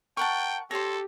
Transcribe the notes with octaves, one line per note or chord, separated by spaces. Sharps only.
A#4 F#5 G5 A5 C#6
G4 A4 C5 C#5 A#6